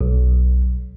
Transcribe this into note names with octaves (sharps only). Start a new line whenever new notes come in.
B1